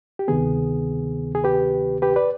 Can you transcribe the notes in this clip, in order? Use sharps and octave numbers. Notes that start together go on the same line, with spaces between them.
G4
D2 C3 D#3 B3 G#4
G#4
G4 B4
G4 B4
B4 D5